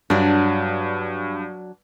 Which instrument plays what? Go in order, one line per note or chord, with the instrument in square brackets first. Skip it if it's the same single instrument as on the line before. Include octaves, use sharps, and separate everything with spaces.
[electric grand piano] G2 [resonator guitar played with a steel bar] F#3 D4